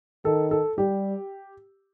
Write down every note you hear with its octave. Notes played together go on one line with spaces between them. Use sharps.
D#3 A4
A4
G3 G4